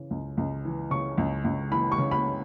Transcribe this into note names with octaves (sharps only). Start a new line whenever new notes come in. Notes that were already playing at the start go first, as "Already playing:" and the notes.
Already playing: C#3 E3
C#2
C#2
E3
C#3 C#6
C#2
C#2
E3 B5
C#6
C#3
B5